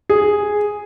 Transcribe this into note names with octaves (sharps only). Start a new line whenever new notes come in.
G#4